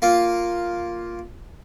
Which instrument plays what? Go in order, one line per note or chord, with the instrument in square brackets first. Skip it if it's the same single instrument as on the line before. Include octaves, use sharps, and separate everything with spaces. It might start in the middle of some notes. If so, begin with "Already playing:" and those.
[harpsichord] A#3 F4